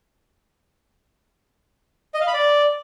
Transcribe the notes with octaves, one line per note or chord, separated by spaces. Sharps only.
D#5
F5
B5
D5